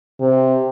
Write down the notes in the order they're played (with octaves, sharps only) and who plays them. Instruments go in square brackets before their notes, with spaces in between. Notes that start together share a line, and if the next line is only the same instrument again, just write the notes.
[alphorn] C3